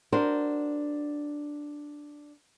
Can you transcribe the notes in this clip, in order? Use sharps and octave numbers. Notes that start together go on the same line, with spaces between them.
D4 F#4 A#4 C5